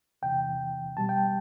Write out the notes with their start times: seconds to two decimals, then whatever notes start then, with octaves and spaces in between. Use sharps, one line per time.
0.22 E2 C3 E3 G5
0.97 B2 G3 A5
1.09 G5